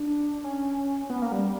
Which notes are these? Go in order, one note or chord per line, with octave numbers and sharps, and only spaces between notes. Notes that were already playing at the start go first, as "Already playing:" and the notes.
Already playing: D4
C#4
B3
A#3
G3